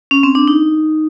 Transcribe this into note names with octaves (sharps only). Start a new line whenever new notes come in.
C#4
C4
D4
D#4